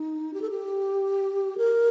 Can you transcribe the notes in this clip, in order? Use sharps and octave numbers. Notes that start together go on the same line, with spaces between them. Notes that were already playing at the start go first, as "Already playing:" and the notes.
Already playing: D#4
G4
A4
G4
A#4